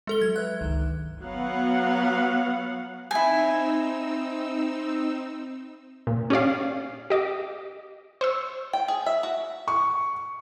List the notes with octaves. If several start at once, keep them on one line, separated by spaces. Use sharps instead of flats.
G#3 A4 G7
F#3 G#6
B4 E5 F#6
G1 C#2 D#3
F#3 B3 F5 F#5
C4 D#4 E4 G#5 E6
A#2
C#4 G4 D5 F5
G4 D#5 D6
C5 C#6 E6
G5
G#4
E5
F#4
C#6